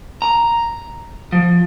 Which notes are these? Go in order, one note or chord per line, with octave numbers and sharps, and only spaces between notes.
A#5
F3